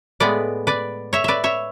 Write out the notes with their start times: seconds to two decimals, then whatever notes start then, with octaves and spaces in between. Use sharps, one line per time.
0.20 A2 G#3 B3 B4 D5
0.67 B4 D5
1.13 C#5 E5
1.24 B4 D5 E5
1.44 C#5 E5